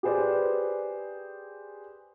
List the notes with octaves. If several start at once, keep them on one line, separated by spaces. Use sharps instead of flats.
G4 G#4 B4 C5 D5